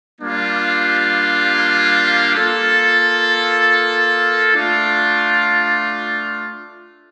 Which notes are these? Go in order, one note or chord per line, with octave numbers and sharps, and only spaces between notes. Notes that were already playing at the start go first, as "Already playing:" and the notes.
G3 A#3 D4 F4
A#3 F4 A4
A3 D4 F4